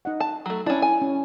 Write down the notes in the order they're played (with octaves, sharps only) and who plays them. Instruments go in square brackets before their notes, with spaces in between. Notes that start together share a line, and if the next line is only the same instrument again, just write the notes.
[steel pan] D#4 D#5 F#5
[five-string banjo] A5
F#3 A3
[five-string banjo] C#4 D4 [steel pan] E4 D5 A5
[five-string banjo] G#5
[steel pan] C#4